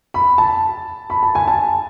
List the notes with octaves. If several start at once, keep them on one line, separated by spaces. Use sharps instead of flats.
B5
A5
B5
A5
G#5
A5